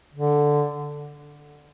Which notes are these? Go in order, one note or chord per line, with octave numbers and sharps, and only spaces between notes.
D3